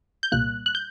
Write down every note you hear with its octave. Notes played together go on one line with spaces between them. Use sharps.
G6
C2 A#2 G3 A#3 F#6
F#6
G6